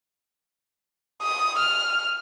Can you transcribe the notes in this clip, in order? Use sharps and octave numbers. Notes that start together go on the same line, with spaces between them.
D#6
F6